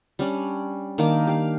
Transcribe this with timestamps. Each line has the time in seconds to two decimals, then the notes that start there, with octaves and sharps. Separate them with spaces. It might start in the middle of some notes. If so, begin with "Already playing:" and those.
0.19 G3 C#4 D4
0.98 D#3 A#3 D4 D6
1.27 G4 F5